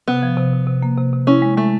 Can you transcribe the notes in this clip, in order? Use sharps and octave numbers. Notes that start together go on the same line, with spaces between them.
C3 B3
F3
C3
C3
C3
A#3
C3
C3
C#4 E4
G#3
G#3 A3